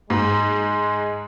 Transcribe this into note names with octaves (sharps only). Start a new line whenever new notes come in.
G#2 G#3